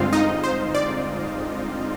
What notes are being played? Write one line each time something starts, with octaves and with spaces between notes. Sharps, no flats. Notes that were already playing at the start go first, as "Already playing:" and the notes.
Already playing: G2 D3 G#3 C4 F4 F5
D#4 D#5
C5
D5